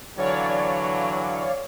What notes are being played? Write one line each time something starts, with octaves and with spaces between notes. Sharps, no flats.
D3 E3 F#3 C#5 D5 F5